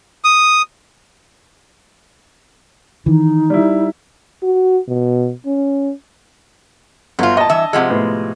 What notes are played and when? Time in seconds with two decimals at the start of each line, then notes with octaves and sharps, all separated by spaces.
0.24 D#6
3.06 D#3 E3 D#4
3.50 G3 E4
4.43 F#4
4.88 B2
5.46 C#4
7.19 G1 F#3 F4
7.37 A#2 D#5 A5
7.49 G2 E3 E5
7.73 C3 F3 G#3 F#5 E6
7.89 A2 B3